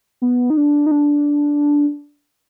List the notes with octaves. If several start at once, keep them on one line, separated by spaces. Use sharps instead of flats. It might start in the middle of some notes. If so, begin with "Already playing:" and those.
B3
D#4
D4
D#4
D4